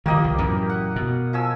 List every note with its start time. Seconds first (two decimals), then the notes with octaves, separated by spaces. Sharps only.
0.06 D#3 F3 A#3 G4 D#5
0.24 C2
0.39 F#2 A2 E3 A#4
0.70 F#5
0.96 B2
1.33 F3 G#5 E6